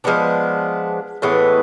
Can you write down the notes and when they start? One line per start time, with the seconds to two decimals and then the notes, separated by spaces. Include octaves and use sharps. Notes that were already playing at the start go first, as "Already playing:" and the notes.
0.04 F3 G#3 B3 D4
1.22 A2 E3 G#3 B3